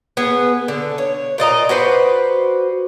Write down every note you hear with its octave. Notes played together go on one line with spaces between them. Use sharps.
B3 G#4
D3
C#5
A#2 D5 D#5 A#5
F#4 B4 C5 D5